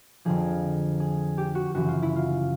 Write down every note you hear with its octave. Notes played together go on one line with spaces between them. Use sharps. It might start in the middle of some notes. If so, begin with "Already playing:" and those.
F2 D3 F3 G#4
G#4
G4
F#4
F#2 C#3 E3 F#4
F4
E4
F4